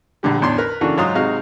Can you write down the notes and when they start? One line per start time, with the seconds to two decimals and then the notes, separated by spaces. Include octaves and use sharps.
0.23 A#1 A#2 D3 G3
0.41 A1 E2 D4 C6
0.58 A#4 B4
0.81 C#3 E3 A#3 D4 F#4 A4
0.97 G#2 F#3 D#4 F4 D#6
1.14 G#1 C3 G#3 D#4 F#4 F5